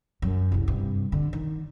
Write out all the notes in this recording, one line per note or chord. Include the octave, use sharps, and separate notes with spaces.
F#2
F#1 C2
G2 C3
D3
D#3